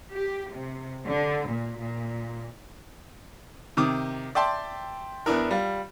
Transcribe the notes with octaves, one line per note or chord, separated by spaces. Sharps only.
G4
C3
D3
A#2
A#2
C3 D#3 D6 D#6
D5 E5 G5 A5 C6
E2 B3 D4 E4 A#4
G3 F4